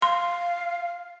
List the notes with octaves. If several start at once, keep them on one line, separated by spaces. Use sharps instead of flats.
F5 C6